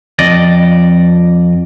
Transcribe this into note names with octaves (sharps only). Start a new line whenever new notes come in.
F2 D5 D#5